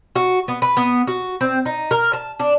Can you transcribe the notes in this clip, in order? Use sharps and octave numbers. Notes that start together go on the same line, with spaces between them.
F#4
B3
B4
B3
F#4
C4
D#4
A#4
A5
D4